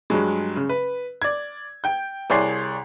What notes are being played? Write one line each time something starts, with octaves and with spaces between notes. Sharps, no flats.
G2 F#3 G#3
C#3
B4
D5 G#6
G5 G6
C2 G#4 C#5 D5 C6 C7